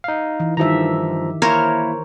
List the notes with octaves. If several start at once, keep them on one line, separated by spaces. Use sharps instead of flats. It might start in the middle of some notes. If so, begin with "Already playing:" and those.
D#4 F5
E3
G2 D#3 F3 G4 E5 A#5
A#3 E4 A#4 C5 C#5